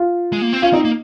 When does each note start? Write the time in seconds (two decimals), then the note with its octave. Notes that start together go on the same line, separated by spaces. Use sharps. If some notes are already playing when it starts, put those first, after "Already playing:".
Already playing: F4
0.33 G#3
0.42 A#3
0.53 C4
0.62 C#4 F4
0.73 C4 D#4
0.85 A#3